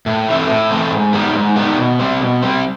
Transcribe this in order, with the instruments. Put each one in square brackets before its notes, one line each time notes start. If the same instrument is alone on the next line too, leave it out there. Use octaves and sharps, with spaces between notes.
[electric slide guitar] A2
E3 A3 C4
A2
E3 A3 C4
G#2
D#3 G3 B3
G#2
D#3 G3 B3
B2
G3 C4
B2
G3 C4